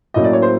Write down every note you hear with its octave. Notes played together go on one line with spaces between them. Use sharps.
A2 F#3 A#3 C#4 D#5
D5
C#5
C5